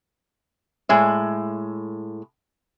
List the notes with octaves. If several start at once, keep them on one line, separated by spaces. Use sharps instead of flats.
A2 G#3 E5